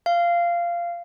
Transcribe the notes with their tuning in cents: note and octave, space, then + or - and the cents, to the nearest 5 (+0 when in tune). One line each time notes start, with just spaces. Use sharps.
F5 -15